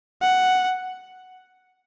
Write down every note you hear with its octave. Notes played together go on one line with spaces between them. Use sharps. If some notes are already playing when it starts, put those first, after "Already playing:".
F#5